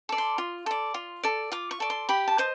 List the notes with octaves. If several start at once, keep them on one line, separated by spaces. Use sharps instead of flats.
A4 D5
C6
F4
A4 D5
F4
A4 D5
F4 D6
C#6
A4 D5
C6
G4 B5
A5
C5 D#5